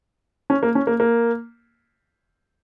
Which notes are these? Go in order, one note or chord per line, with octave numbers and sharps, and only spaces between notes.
C#4
A#3
C#4
A#3
A#3